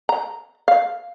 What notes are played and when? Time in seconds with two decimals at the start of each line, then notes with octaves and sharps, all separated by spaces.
0.09 A#5
0.68 F5